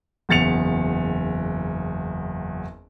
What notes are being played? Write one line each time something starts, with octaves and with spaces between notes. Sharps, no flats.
F#1 E2 A6 C#7 F7